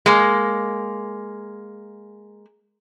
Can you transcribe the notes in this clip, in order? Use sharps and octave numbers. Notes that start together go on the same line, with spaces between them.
G#3 A#3